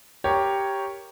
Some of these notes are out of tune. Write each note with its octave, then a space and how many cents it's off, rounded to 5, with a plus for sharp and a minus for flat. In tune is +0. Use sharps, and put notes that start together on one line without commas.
G4 +0 A#4 +0 C#5 +0